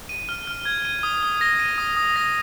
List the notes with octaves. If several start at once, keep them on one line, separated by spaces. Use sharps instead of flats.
D#7
F6
F6
G#6
D#7
D#6
D#6
A#6
D#7
D#6
D#6
A#6